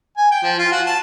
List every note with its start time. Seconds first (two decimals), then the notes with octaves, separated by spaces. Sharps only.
0.17 G#5
0.31 G5
0.43 F3
0.59 F4
0.72 F#4
0.86 A5